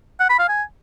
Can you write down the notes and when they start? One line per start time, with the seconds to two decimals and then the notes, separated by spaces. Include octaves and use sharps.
0.20 F#5
0.29 B5
0.39 F5
0.49 G#5